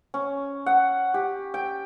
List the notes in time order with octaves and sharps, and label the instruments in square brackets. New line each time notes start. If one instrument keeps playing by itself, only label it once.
[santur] C#4
F#5
G4
G5